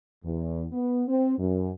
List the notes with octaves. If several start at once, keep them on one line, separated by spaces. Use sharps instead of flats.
E2
B3
C4
F#2